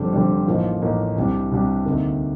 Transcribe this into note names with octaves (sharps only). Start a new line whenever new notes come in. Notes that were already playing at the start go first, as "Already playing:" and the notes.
Already playing: F1 F2 D3 G3 D4
F1 F2 D3 G3 D4
A1 A2 F3 A#3 D#4
A1 A2 F3 A#3 D#4
C2 C3 G3 D4
C2 C3 G3 D4
D2 C3 D#3 A#3